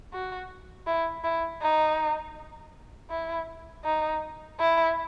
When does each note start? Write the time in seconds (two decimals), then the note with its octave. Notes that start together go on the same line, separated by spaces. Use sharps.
0.13 F#4
0.87 E4
1.24 E4
1.62 D#4
3.10 E4
3.84 D#4
4.59 E4